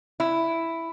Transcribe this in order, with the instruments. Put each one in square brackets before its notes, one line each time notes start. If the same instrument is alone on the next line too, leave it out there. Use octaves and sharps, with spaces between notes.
[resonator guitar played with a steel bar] E4